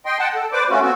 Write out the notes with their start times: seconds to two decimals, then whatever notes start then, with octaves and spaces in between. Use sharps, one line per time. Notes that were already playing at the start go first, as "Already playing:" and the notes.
0.06 D#5 G5 C6
0.19 F#5 G5 A5
0.35 A4
0.52 B4 C5 D5 D6
0.69 A3 C#4 F4 F#4
0.82 B3 C4 F#4